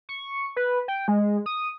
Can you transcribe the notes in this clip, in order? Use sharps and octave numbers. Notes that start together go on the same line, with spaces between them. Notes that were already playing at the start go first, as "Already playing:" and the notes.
C#6
B4
G5
G#3
D#6